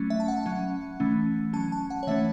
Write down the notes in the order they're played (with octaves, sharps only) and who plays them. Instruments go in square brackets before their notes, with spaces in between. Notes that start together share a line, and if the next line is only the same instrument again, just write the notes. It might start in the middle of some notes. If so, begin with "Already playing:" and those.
Already playing: [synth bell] F#3 A3 C#4
E5
A5
F#5
F#3 C#4
E3 A3 C#4
C#4 A5
F#3
A5
F#5
C#5
E3 A3 C#4 E5